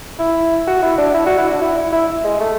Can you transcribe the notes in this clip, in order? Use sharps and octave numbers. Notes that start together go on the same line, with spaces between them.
E4
F#4
E4
D4
E4
F#4
E4
D4
E4
E4
E4
G#3
A3